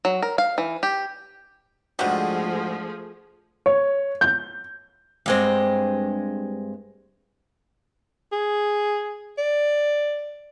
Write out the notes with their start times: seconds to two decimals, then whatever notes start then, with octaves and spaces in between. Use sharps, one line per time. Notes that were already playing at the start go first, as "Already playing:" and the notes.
0.05 F#3
0.22 A#4
0.38 F5
0.58 E3
0.83 G4
1.99 G#2 D3 F3 G3 A3 F#4 G#4
3.66 C#5
4.21 G6
5.26 G2 G#3 C4
8.32 G#4
9.38 D5